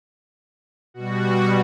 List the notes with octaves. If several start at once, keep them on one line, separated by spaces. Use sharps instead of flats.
B2 G3 F#4